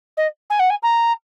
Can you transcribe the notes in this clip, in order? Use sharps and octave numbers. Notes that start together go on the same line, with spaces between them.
D#5
G#5
F#5
G#5
A#5